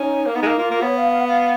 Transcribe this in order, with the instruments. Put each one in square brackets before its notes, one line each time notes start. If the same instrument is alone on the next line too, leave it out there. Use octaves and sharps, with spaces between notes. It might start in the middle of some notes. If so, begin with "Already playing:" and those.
Already playing: [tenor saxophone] C#4 [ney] D#4
[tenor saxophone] A#3
[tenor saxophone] B3 [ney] D#4
[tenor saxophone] G#3
A#3
[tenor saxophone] A#3 [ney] F4
[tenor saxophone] A#3
[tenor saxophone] B3 [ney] C#5
[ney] F5
F5
F#5
F5